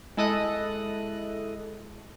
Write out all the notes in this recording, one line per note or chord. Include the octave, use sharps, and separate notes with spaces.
G#3 E4 A4 D#5 D#6 F#6